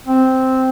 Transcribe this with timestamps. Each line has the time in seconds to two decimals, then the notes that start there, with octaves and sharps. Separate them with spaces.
0.07 C4